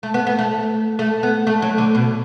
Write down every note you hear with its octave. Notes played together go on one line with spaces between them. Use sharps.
A3
B3
B3
A3
A3
B3
A3
F#3
D3
B2